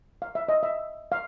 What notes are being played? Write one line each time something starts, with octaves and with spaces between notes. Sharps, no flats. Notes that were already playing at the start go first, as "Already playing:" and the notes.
F5
E5
D#5
E5
F5